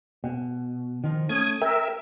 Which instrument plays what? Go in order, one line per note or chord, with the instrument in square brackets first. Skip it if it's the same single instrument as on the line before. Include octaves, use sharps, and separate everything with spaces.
[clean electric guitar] B2
D#3 F3
[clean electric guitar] A3 C#4 [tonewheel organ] D#6 G#6
[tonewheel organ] A#4 E5 [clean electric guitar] G5